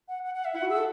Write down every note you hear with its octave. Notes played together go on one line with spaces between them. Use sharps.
F#5
F#5
F#5
E5
E4 F#5
F#4
G#4 E6
A4